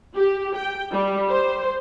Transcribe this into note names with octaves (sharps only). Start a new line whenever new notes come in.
G4
G5
G3
C5